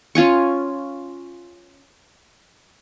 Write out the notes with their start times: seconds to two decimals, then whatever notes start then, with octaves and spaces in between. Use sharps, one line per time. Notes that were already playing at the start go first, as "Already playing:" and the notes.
0.15 C#4 F4 G#5 C#6